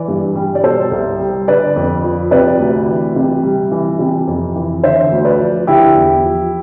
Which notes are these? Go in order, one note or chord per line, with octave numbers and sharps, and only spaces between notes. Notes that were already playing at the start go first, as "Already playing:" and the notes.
Already playing: E3 B4 D5
G2
G3
D5
B2 A4 C5
C2
G3
D3 B4 D5
F2
F3
C3 B4 D5
D2
E3
C3
G3
E3
C3
F2
E3
D3 C5 E5
D2
B4 D5
F3
D3 E4 G4
E2
F3